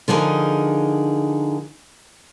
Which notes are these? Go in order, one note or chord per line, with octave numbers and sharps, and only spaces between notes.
D3 F3 D#4 G#4 A#4